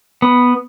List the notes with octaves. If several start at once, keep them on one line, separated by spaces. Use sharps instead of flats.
B3